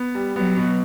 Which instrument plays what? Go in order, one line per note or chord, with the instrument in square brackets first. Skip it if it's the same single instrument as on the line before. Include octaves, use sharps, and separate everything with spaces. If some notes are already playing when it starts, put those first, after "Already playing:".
Already playing: [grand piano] B3
G3
[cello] F#3 [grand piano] B3
[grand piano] B2